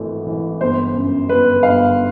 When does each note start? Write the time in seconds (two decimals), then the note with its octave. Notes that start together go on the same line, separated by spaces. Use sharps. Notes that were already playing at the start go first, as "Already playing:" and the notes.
Already playing: G#1 E3 A3
0.27 E3
0.60 G1 C5
0.95 F#2
1.29 G1 B4
1.63 G1 F5